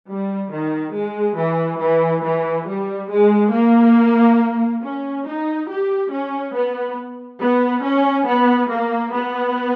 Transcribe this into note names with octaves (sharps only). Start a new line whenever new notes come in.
G3
D#3
G#3
E3
E3
E3
G3
G#3
A#3
C#4
D#4
G4
C#4
B3
B3
C#4
B3
A#3
B3